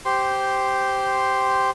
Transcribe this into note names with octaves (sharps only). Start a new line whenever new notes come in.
G4 C5 C6